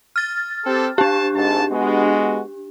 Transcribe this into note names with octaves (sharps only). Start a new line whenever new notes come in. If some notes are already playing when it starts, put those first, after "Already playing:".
F6 A6
C4 G4 A4
D4 G4 A5
G#1 G#2 A5
G#3 B3 F#4